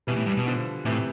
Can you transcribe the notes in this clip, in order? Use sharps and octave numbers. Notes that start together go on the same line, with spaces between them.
B2 E3 G3
A2
G2
B2
D3 F3
A2 C3 E3